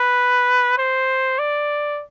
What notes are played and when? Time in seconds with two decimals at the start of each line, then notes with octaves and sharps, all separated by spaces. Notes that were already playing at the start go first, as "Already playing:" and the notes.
Already playing: B4
0.78 C5
1.39 D5